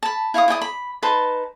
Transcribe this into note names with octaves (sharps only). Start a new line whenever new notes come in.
A5 B5
E4 F5 C#6 D#6
E4 D5 G5 D#6
B5
D#4 B4 A5 C6